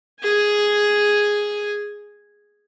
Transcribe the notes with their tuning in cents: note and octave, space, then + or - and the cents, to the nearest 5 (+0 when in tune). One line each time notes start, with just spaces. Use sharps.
G#4 +0 G#5 +0